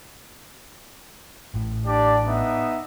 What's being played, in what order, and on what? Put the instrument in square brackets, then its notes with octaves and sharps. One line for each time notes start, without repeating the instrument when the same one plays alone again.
[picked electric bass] A1 A2
[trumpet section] D4 G4 D5
B3 D#4 E5